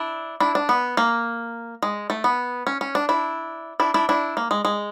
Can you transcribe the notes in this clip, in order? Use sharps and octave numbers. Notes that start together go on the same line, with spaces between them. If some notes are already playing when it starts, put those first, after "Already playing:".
Already playing: D4 E4
D4 E4
D4
B3
A#3
G#3
A3
B3
C#4
C#4
D4
D4 E4
D4 E4
D4 E4
D4 E4
A#3
G#3
G#3